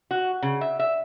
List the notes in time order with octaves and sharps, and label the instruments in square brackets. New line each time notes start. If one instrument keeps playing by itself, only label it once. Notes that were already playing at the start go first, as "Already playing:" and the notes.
[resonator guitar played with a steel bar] F#4
C#3
E5
E5